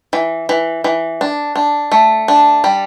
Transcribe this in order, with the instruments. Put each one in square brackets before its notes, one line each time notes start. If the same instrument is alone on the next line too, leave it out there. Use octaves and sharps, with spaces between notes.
[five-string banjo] E3
E3
E3
D4
D4
A3
D4
G3